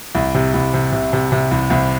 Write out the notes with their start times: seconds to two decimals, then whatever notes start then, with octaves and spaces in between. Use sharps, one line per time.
0.15 C2
0.34 C3
0.54 C2
0.74 C3
0.92 C3
1.13 C3
1.32 C3
1.51 C2
1.70 C2